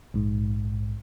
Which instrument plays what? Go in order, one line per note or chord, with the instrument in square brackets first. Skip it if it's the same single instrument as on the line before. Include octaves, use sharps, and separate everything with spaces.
[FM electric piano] A#1 G#2